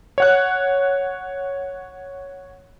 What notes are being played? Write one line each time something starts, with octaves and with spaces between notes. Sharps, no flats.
C#5 F#5 F#6